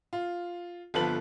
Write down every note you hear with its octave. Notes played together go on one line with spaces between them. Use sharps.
F4
G1 F3 B3 A4 B4 F#7